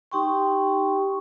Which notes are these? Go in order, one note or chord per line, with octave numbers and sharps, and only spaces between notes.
D#4 G4 G5 C6 C#6